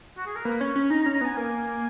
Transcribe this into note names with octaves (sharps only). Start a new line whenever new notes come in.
F#4
G#4
A#4
A#3 B4
C#4 C#5
C#4
D#4 A#5
A#5
C#4
A#5
B3 G#5
A#3 G#5